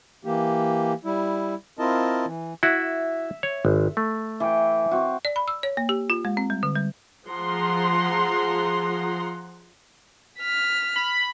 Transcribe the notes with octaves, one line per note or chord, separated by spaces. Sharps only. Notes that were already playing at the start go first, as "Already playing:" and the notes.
E3 A#3 G4
G3 E4
C4 E4 F4 A#4 D#5 A5
E3
E4 F#4 E5
C#5
G#1
A3
E3 G5
C4 F#4
D5
B5
E6
C#5
A#3
G4
F4
G#3
C4
G3
D3
G3
F3 G#4 F#5 A#5 C6
F6 B6
B5